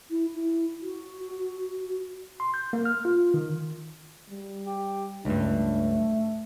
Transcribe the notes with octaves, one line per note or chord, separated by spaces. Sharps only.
E4
E4
F#4
C6
G6
A#3
F6
F4
D#3
G3
G4
C#2 G2 A3 D4